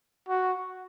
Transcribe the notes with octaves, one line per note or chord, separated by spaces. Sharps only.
F#4